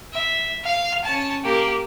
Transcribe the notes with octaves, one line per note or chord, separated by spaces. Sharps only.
E5
F5
C#4 A5
A#3 G4